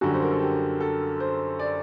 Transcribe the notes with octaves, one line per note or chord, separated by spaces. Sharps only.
F#2 D3 G3 F#4
C5
A#4
A4
G4
A4
C5
D5